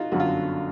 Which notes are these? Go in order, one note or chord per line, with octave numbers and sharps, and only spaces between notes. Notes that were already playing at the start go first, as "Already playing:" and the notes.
Already playing: D#4 F4 F#4
G1 F#2 D3 F#3 F#4
F4